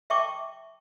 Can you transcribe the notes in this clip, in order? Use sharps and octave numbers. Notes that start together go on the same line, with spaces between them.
E5 G5 A5 C#6 D6